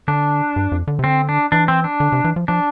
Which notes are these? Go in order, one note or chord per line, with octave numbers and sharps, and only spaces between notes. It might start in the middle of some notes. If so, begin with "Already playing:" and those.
D3 D4
G2
F2
D3
C3
D3 C4
D4
E3 D4
C4
D4
D3
C3
E3
F3
F3 D4